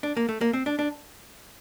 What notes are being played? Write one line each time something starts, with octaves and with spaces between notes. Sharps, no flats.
D4
A#3
A3
A#3
C4
D4
D4